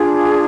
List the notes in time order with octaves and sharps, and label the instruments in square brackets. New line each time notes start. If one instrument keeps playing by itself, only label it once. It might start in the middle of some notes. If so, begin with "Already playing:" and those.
Already playing: [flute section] D4 F4 G#4